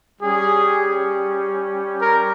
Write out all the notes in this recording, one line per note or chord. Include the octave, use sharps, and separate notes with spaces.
G3 C#4 G4 G#4
A#4